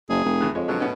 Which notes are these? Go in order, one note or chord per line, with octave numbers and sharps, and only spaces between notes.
F#1 G#4
F1
E2 C#3 F#6
F2 G#3 C#5
B2 D3 F#3 G#3
A2 B3 C#4